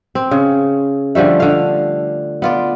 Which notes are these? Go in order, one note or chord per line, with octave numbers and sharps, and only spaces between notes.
C4
C#3
D3 F3 G3 A3
D3 F5
B3 F4 D5